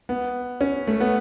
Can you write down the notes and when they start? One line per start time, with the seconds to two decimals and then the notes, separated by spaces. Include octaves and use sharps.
0.09 B3
0.61 C#4
0.87 A3
1.00 B3